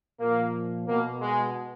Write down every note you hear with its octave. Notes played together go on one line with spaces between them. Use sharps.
A#2 F3 A#3
B2 A#3
G#3